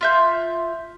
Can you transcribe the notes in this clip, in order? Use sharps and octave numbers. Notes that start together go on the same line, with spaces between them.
F4 E5 G6